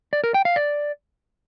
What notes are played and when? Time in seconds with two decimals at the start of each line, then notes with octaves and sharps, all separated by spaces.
0.13 D5
0.24 A#4
0.34 G5
0.45 F5
0.56 D5